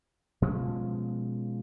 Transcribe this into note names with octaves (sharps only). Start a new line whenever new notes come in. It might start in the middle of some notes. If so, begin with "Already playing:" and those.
B2 F3 G#3 C#4